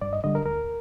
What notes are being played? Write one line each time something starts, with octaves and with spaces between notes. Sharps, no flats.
G2 D5
D#5
D3 G3 D#5
A#4
D2 A#4